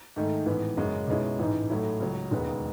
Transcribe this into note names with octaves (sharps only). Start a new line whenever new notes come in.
G#2 D#3 A3 D#4
A1 G#2 E3 B3
F#2 C#3 G#3 C#4
B1 B2 G#3 C#4 E4
A1 G#2 E3 G#3 D#4
A2 F#3 A3 E4
C#2 C#3 F#3
E1 D#2 C#3 G#3 B3